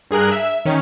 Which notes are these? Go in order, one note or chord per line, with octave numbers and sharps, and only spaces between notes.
G2 G#4 A#4 F#6
E5
D#3 C#4